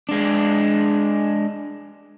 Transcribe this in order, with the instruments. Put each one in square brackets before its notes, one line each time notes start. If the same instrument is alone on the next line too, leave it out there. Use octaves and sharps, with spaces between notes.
[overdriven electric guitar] G#3 D4